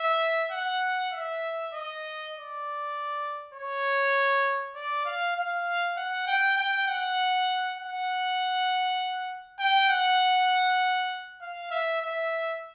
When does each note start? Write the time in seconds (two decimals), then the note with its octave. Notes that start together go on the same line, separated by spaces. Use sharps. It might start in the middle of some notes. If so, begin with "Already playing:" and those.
Already playing: E5
0.51 F#5
1.13 E5
1.73 D#5
2.34 D5
3.54 C#5
4.75 D5
5.05 F5
5.36 F5
5.97 F#5
6.27 G5
6.57 G5
6.87 F#5
7.78 F#5
9.60 G5
9.89 F#5
11.41 F5
11.71 E5
12.02 E5